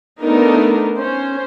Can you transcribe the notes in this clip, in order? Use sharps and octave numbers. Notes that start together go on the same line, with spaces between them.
A3 B3 D4 D#4 A#4
C#4 C5